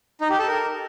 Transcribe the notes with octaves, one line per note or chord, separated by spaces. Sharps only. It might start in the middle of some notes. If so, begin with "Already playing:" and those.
D#4
G4
A4
A#4